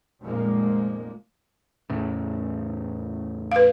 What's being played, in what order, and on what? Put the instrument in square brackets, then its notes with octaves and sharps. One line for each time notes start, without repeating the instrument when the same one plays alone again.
[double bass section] F1 A#2 F3 G#3 A#3
[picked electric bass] E2 A2 C#3
[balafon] B4 F5